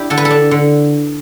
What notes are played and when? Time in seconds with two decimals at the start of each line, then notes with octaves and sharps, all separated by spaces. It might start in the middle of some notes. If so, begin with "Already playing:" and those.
Already playing: D4 E4 G4
0.10 D3 A4
0.17 B4
0.25 A4
0.31 D4
0.51 D3